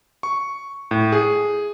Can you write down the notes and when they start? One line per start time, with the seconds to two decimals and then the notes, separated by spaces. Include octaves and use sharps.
0.23 C#6
0.91 A2
1.12 G#4